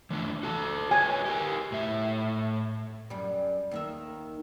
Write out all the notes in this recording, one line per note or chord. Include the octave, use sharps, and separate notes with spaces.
E3 A3 D4
F#4 A4 A5
G#4 B4 C#5 G#5
G4 A#4
A2 E5
F#2 G3
D#2 D#3 E5